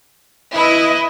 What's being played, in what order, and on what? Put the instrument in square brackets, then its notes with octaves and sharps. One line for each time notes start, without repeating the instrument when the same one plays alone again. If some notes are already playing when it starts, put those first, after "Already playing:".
[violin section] E4 [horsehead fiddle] B4 D#5